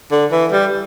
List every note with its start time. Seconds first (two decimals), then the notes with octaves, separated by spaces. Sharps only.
0.12 D3
0.31 E3
0.52 G3